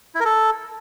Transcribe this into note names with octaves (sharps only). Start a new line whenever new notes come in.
E4
A#4
A4